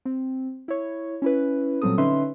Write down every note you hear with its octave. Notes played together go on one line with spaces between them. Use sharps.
C4
E4 C#5
C#4 E4 B4
A#2 F#3 G3 C4 A4 D#6
D3 C#4 D#4 B4 E5 C6